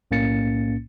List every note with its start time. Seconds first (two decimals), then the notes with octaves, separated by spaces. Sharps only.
0.11 B1 A2 A#3 C#4 A6 C#7